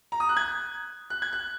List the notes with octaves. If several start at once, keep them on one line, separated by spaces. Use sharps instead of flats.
A#5
D#6
F#6
G#6
F#6
G#6
F#6